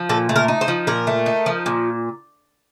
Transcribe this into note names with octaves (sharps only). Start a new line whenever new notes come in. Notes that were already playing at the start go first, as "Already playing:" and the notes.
Already playing: F3
A#2 A4
A3
A#4
D#4
C5
F3
A#2 A#4
A3
D#4
F3
A#2